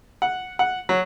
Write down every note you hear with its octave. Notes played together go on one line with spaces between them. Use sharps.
F#5
F#5
F#3